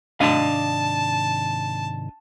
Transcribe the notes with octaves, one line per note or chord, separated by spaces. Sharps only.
G#2 C3 D#3 D4 D#5 F5 A5